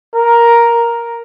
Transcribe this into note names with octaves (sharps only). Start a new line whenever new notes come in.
A#4